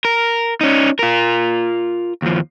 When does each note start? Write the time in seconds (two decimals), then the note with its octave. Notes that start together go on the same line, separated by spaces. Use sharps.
0.05 A#4
0.61 C#4 D#4
0.99 F4 A#4
2.22 D#2 F3